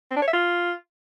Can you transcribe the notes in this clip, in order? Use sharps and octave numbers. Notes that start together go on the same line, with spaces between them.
C4
D4
C#5
E5
F4